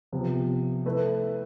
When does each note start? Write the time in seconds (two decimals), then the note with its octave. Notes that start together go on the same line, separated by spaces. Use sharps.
0.12 C3 F3 B3
0.86 A3 E4 B4